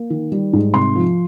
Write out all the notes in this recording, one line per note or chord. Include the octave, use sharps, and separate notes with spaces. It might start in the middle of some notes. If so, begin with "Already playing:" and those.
Already playing: A#3
D#3
G3
G#2
C3 C6
F3